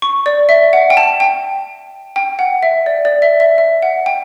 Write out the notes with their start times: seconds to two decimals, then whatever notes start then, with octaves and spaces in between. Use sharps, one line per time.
0.02 C#6
0.26 D5
0.49 E5
0.73 F#5
0.90 G5
0.97 A5
1.20 G5
2.16 G5
2.39 F#5
2.63 E5
2.86 D5
3.05 D5
3.22 E5
3.40 E5
3.58 E5
3.82 F#5
4.06 G5